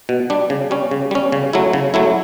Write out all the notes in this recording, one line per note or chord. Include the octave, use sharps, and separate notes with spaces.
B2
G3 D4
C#3
G3 C#4
C#3
G3 C#4
C#3
F#3 A3 E4
C#3
F#3 A3 E4